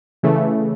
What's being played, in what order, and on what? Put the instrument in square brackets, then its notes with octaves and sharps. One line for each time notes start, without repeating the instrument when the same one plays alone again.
[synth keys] C#3 E3 A3